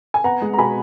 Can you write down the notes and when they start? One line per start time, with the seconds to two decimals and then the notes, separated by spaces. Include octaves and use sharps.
0.14 G#5
0.24 B3 F#5 A#5
0.42 G#3
0.54 A#5
0.58 B2 G#5 B5